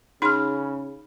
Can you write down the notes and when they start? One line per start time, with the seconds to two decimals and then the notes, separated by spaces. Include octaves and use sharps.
0.22 C#3 D#4 G#4 B5 C6 F6